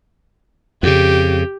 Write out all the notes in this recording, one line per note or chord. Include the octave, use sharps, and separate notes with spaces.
F2 C#3 G4